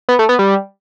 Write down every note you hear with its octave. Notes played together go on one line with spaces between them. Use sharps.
B3
A3
B3
G3